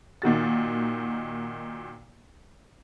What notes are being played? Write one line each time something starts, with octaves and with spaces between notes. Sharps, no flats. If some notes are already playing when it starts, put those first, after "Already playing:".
A#2 D#3 F#4 A6